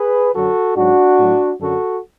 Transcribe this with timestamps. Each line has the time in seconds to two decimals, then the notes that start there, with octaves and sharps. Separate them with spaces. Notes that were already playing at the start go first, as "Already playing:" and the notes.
Already playing: G#4 B4
0.33 F#2 D3 F#3 F#4 A4
0.76 G#2 F#3 D4 F#4
1.19 A2 F#3
1.60 F#2 D3 F#3 F#4 A4